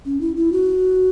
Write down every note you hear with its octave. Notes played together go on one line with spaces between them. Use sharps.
C#4
E4
E4
F#4